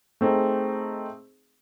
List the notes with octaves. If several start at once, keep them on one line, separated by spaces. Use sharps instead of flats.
A3 C4 D#4 G#4